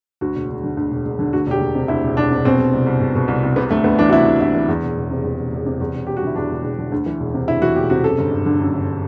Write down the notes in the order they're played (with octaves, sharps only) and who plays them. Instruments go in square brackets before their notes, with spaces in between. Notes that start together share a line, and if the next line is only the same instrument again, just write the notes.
[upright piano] D2 F#4
E1
E1
D3
D2
E1
E1
D3
D2 F#4
E1 G4
E1
C3
D2 E4
E1
E1 D4
C3
B2 C4
B2
C2
C2
B2
B2
C2
C2
C3 B3
D2 A3
D2 B3
E3 D4
F#4
C3 E4
D2
D2 E4
E3
E2
E1
E1
C3
E2
E1
E1
C3
E2
E1
E1 G4
F#4
D3 E4
E2 D4
E1
E1
D3
D2
E3
E1
C3
D2 E4
E3 F#4
E1 G4
C3 F#4
F#2 A4
G1
G1
D3
F#2
G1